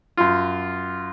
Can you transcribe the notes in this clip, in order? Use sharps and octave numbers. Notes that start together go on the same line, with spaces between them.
F#2 F4